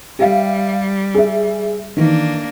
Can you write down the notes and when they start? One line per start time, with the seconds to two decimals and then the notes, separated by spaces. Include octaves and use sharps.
0.19 G3 G4 E5 F5
1.14 G#4 E5
1.97 D#3 E3 A#3 D4